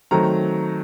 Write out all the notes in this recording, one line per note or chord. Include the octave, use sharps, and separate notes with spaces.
D#3 F#3 A3 C4 A#5